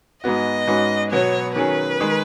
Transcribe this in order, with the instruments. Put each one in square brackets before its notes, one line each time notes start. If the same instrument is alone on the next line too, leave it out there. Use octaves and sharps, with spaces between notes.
[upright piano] G#2 G#3 B3 F#4 [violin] D#5
[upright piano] G#2 G#3 C#4 F#4 B4
[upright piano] B2 F#3 B3 F#4 [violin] C#5
[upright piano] D#3 F#3 C#4 G#4 [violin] B4
[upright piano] D#3 G#3